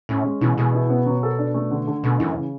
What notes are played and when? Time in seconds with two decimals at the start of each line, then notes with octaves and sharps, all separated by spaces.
0.09 A2 C#4
0.25 G#3
0.41 B2 E3
0.58 B2 G#4
0.74 E4
0.90 B3
1.06 F#3
1.23 A4
1.39 D4
1.54 A3
1.71 D3
1.88 D3
2.03 B2 A3
2.20 F#2 E3
2.36 C#3